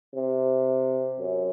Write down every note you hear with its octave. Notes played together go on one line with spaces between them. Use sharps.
C3
F#2